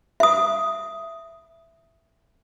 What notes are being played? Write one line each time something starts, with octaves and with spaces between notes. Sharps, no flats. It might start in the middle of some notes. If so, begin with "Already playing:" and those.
E5 D#6